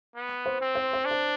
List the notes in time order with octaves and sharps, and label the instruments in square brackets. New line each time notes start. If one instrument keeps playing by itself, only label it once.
[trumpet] B3
[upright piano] C5
[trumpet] C4
[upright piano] C5
C5
[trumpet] D4
[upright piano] C5